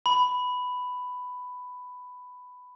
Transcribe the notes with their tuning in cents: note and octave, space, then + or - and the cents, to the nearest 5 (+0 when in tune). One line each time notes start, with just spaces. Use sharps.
B5 +10